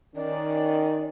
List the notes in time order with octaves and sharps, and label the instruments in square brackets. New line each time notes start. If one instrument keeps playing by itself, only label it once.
[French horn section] D#3 C#4 [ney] D5